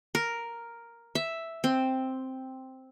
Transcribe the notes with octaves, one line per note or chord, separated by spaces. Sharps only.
A#4
E5
C4